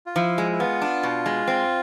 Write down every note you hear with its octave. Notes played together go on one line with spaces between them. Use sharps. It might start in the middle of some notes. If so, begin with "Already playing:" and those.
F4
F3 E4
G#3
E4
B3 F4
D4
B2
G#3
C4